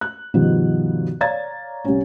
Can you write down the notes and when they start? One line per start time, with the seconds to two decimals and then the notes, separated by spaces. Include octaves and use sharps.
0.01 F#6
0.34 G2 B2 D#3 F3
1.21 C#5 D5 F5 A#5 G#6 A6
1.85 C2 C#4